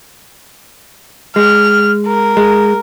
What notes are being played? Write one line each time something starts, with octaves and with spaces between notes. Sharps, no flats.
G#3 F6
A#4
G#3